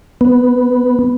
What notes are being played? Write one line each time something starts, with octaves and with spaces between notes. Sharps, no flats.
B3